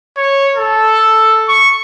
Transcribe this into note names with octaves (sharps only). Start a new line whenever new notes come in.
C#5
A4
C#6